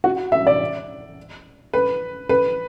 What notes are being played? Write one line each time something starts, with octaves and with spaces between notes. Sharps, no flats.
F#4
E5
D5
B4
B4